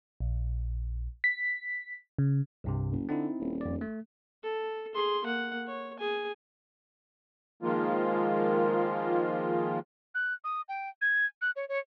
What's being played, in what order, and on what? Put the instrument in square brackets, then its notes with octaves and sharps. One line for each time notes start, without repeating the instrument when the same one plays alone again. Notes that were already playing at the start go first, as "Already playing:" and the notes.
[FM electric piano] A#1
B6
C#3
[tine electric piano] C2 G2 C3
[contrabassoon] F#1
[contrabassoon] D3 [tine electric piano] C4 D#4 E4
[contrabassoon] D#1
[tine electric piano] F2 D5
A3
[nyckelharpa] A4
G#4 C6
A#3 F#5
C#5
G#4 G#5
[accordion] D#3 F3 G#3 A#3 F4
[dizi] F#6
D#6
G5
G#6
F#6
C#5
C#5